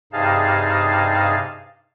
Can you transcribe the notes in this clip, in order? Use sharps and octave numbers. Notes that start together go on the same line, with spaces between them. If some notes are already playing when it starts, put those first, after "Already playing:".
G2 C3 D#4 G#4 F5 A5